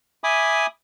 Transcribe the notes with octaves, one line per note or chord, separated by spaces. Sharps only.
E5 G#5 B5 D6 D#6